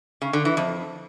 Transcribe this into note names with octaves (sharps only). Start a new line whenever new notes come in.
C#3
D3
E3
F2